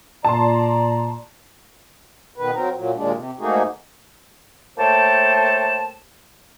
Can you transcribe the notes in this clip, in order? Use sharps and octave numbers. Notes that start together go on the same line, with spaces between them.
A#2 D5 A5 A#5 C6
B2 D#3 B4
F#3 C4 A#4
A#2 F#3
D#2 A#2 G#3 D4
C3
G#2 A3 A#3 D#4 F#4 G#4
A3 A#3 C5 C#5 G5 A5